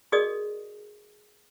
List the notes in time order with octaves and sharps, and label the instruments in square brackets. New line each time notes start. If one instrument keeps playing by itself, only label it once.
[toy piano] F#4 G#4 A#4 D5 D#5 D#6